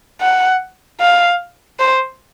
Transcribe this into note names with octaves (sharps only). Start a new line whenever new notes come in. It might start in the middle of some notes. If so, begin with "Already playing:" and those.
F#5
F5
C5